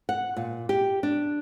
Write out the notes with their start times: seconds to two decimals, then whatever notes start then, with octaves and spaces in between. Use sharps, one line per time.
0.09 F#5
0.37 A#2
0.69 G4
1.03 D4